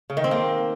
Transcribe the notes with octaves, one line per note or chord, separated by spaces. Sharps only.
C#3
D#3
C4
A#3